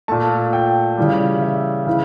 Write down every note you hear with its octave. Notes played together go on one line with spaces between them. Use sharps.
A#2 A3 A5
G5
C#3 E3 G3
E5
C#3 E3